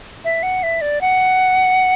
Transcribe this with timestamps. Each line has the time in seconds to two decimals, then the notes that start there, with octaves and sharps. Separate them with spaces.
0.25 E5
0.43 F#5
0.63 E5
0.81 D5
1.01 F#5